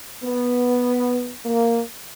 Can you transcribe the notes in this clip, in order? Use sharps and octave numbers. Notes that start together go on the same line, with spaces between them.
B3
A#3